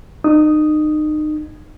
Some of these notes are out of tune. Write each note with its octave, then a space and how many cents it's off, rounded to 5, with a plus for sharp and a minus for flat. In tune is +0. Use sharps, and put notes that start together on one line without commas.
D#4 -30 D#6 +0